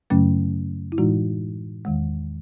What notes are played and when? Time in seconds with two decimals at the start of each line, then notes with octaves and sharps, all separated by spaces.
0.10 F#2 C#3 F#3 A3 C#4
0.92 E4
0.98 A2 E3 G#3 D#4 F#4
1.85 E2 D#3 G#3